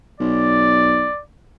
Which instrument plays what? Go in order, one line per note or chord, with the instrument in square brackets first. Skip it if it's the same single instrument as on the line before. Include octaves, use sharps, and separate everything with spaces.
[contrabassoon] B1 [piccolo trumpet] D5